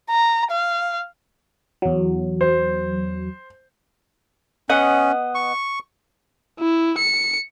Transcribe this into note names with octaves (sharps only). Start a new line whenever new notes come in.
A#5
F5
E2 F#3
C5
B3 C#4 D#5 F#5
C#6
E4
C#7